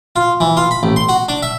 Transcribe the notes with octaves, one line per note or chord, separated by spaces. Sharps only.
F4
E3
F4
B5
A1
C6
F#4
D4
E5